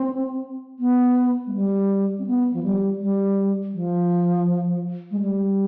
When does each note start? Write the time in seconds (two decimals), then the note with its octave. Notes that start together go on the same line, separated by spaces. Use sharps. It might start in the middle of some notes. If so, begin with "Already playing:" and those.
Already playing: C4
0.79 B3
1.47 G#3
1.54 G3
2.19 C4
2.26 B3
2.53 F3
2.63 G3
3.01 G3
3.74 F3
5.11 G#3
5.20 G3